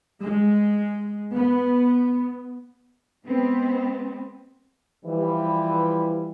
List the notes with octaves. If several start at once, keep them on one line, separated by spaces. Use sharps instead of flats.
G#3
B3
G#3 B3 C4
E3 F3 G3